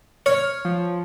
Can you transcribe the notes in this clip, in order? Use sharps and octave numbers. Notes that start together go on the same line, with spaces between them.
C#5 F6
F3